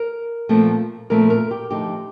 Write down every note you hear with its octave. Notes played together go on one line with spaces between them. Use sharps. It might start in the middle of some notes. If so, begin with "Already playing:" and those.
Already playing: A#4
A#2 F3 A3 C4
A#2 F3 A3 C4 A#4
A#4
G4
D3 F3 A3 D#4 G4